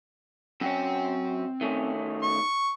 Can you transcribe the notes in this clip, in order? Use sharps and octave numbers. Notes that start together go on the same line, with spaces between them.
F#2 C4 C#4 G5
D#3 A3 C#4
C#6